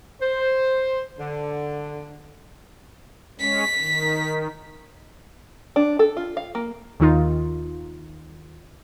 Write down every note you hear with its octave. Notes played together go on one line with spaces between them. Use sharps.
C5
D3
G#3 C#4 B6
D#3
D4
A4
F4
F5
A#3
D#2 D#3 D#4 F4